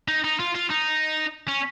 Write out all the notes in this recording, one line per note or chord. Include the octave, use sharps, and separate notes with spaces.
D#4
D#4
F4
F4
D#4
C#4